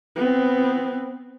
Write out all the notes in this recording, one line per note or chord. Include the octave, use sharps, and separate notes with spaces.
B3 C4